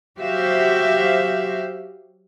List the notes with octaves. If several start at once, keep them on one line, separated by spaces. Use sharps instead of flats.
F#3 F#4 G4 C5 E5 F5